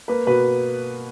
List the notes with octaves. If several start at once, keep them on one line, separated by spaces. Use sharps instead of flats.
A#3 B4
B2 B4